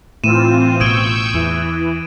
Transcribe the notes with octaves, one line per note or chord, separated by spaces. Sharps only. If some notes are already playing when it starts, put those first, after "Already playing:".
A2 E3 C4 F4 D#7 E7
A1 B2 C#6 D#6 E6 G6 G#6 D7
E2 E3